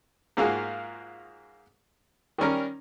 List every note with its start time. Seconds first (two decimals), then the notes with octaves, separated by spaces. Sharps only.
0.37 G#2 A#3 F4 F#4 G#4
2.38 D#3 G3 C#4 A#4